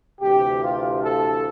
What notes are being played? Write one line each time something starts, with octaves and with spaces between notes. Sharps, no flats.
D2 C3 E3 G4
F4
A4